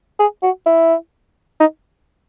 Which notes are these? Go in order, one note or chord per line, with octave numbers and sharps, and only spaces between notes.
G#4
F#4
E4
D#4